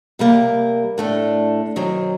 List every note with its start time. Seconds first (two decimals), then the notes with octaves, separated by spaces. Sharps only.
0.19 C3 G3 A#3
0.98 A2 A3 D4
1.76 F#2 D#3 F#3 C4